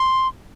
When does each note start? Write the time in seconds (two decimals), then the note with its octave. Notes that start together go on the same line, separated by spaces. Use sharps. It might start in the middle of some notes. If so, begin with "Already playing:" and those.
Already playing: C6